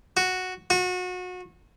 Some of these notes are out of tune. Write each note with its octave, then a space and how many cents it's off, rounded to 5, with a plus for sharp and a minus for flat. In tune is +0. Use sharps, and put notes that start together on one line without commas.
F#4 -5
F#4 -30